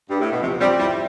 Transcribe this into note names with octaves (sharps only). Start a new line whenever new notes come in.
G2
A2
B2
C3 F3
G3 C4
G3 E4